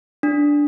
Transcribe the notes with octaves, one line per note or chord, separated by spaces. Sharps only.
D4